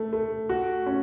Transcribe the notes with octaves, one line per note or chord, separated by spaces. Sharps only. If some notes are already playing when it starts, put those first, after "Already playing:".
Already playing: A3
A3
F#4
C#4